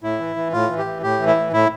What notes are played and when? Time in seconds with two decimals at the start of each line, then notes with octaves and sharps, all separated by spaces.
0.03 A2 E4
0.19 E3
0.36 E3
0.52 A2 F4
0.70 E3
0.78 G4
0.86 E3
1.02 A2 G4
1.19 E3
1.27 E4
1.36 A2
1.53 A2 E4